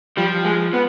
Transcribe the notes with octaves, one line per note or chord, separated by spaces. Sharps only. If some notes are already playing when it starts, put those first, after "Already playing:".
F3 G3
G#3
B3